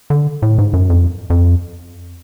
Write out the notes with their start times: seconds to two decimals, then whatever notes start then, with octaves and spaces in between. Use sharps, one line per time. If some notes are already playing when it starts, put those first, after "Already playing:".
0.10 D3
0.42 A2
0.58 G#2
0.73 F#2
0.90 F2
1.30 F2